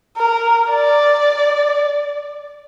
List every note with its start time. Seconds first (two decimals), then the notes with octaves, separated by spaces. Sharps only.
0.17 A#4
0.70 D5